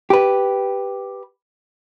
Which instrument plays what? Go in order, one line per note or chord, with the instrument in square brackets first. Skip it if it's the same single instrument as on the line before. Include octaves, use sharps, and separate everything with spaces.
[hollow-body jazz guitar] G4 B4